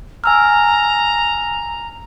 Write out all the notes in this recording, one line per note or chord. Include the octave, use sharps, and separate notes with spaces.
G#5 A#5 E6 F6